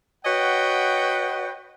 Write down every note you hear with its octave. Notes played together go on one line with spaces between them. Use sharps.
F#4 B4 C#5 D#5 F#5 G5